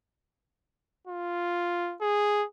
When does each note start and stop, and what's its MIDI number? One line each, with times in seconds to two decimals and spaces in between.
1.07 1.96 65
2.01 2.44 68